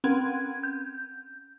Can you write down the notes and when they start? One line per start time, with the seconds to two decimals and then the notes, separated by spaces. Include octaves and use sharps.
0.04 C4 C#4 G#6
0.63 G6